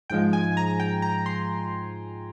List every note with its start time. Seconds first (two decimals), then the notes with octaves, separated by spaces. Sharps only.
0.10 G#2 F3 G#3 G5
0.33 G#5
0.57 A#5
0.80 G5
1.02 A#5
1.26 C6